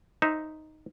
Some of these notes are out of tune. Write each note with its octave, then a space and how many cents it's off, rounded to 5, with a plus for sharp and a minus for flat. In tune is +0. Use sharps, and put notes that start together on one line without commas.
D#4 +0 C5 +5 E5 +0